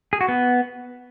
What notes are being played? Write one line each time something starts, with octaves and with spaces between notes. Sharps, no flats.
G#4
F#4
B3